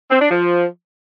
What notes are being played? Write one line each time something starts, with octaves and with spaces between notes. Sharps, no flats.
C4
D4
F3